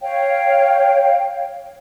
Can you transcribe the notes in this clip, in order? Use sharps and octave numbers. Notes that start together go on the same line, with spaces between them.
C#5 F5 G5